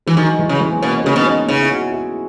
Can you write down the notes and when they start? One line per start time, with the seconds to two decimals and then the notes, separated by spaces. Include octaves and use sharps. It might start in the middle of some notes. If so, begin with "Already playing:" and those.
0.07 E3 G#3
0.17 D#3 F#3
0.39 E3 G#3
0.49 C#3
0.61 E3 G#3
0.73 B3
0.82 B2 A#3 C#4
1.00 C#4
1.05 C#3 G#3 B3
1.16 B2 D#4
1.26 A#3 C#4
1.49 C#3 B3 D#4
1.61 E4
1.70 D#4 F#4
1.92 E4 G#4